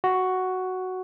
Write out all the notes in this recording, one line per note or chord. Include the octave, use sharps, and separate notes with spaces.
F#4